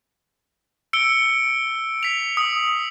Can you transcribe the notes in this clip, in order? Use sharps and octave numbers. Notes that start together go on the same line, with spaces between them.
E6 C#7 D7 G7
B6 F7
D#6